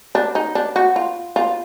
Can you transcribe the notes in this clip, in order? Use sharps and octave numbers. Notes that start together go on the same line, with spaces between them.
D4
D#4
D4
F#4
F4
F4